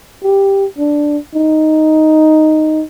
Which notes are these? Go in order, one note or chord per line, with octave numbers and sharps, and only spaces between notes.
G4
D4
D#4